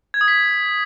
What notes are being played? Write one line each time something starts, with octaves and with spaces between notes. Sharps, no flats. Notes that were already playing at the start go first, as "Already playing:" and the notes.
G#6
D#6
B6